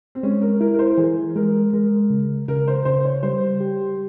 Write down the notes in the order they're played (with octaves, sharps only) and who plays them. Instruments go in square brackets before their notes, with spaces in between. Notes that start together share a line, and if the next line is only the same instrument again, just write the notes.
[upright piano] C4
[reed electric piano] G#3 [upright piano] C#4
[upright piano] A#4
[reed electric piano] E4 [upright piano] A#4
[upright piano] A#4
C5
A#4
[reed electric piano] E3 [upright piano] G#4
[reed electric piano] G#3 [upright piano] A#4
[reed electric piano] G#3 [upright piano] A#4
[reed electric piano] C#3
[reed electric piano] C#3 [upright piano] A#4
[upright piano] C5
[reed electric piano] C#3 [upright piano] C5
[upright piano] C#5
[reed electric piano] G3 [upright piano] C5
[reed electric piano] G4